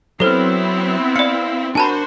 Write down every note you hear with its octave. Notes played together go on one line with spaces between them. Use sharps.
F#3 B3 C4 E4 A4 C5 F6
D5 F5 C#7
D4 F#4 A#4 C5 G#5 A5 B5